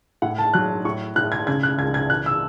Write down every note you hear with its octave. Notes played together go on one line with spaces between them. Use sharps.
A2 F#5
A5
F#3 F#6
A2 C#6
A2 F#6
G#6
C#3 G#6
F#6
C#2 G#6
G#6
E3 F#6
E6